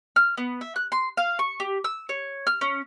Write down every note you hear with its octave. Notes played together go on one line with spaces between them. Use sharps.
F6
B3
E5
F#6
C6
F5
C#6
G4
E6
C#5
F6
C#4